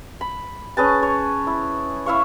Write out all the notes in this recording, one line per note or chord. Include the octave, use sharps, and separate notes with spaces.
B5
C#4 G#4 B4 A5
C#5
E4
E4 E5 F5 C#6